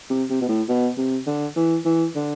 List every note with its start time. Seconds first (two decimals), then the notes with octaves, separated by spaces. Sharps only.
0.10 C3
0.30 C3
0.41 B2
0.48 A2
0.68 B2
0.97 C3
1.27 D3
1.56 E3
1.85 E3
2.15 D3